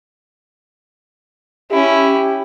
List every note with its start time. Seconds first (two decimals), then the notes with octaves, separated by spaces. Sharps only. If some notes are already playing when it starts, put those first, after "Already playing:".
1.72 C#4 E4 G4